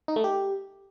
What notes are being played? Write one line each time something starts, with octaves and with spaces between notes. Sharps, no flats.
D#4
A3
G4